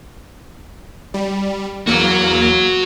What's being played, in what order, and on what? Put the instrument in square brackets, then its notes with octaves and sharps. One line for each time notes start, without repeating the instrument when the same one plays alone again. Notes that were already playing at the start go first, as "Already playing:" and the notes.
[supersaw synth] G3
[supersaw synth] E2 A#3 [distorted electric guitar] F#4 C#5